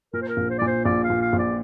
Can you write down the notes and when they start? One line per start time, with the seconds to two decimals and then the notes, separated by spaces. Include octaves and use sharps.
0.13 A#2 A#4
0.22 C5
0.28 A#4
0.37 A#1
0.50 C5
0.58 A#2 D5
0.67 C5
0.85 A#1 D5
1.04 F5
1.10 A#2
1.21 F5
1.33 A#1
1.39 D5